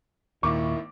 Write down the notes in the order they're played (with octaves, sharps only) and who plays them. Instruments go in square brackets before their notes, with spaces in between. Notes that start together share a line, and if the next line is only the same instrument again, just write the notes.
[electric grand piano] G#1 D#3 A#3 [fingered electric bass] D#2 A#2 [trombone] E4 [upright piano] C#6 D6